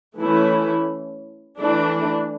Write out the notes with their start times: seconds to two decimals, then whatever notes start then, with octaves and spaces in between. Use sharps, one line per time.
0.18 E3 A3 C#4 E4
1.57 E3 A3 D4